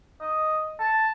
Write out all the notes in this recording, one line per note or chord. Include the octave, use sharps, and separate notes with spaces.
D#5
A5